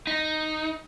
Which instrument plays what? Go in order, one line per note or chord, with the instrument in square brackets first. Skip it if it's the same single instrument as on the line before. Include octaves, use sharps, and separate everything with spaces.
[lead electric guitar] D#4